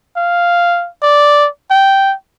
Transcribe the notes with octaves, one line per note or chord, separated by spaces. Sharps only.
F5
D5
G5